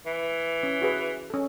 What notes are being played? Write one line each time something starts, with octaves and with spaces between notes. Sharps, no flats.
E3
C#4
F#4 G#4 B4
C#4 A4